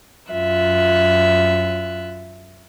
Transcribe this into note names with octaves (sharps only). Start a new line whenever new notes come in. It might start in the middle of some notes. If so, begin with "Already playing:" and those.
F#2 F4 E5 F#6